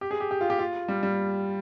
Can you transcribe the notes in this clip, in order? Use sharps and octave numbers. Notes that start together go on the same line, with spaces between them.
G4
G#4
G4
G4
F4
G4
F4
G3
G3